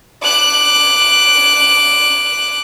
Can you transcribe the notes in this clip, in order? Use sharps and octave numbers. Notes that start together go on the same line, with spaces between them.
D6 F#6